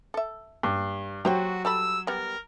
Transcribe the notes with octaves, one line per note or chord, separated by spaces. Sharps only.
A4 E5
G2
F#3 F#4 G4 C5 G5
G3 A4 B5 E6
G3 B3 A#4